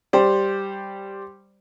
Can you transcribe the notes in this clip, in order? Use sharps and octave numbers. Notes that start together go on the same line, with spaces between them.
G3 G4 C5 D5